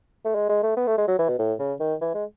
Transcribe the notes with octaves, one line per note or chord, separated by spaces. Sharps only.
A3
G#3
G#3
A3
B3
A3
G#3
F#3
E3
B2
A2
C#3
D#3
E3
G#3